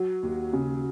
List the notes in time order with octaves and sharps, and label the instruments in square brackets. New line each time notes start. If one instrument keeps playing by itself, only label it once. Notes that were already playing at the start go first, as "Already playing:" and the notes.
Already playing: [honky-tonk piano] F#3
[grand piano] D#2
C#3